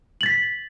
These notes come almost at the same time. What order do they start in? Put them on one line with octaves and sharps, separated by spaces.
F#7 A6 B6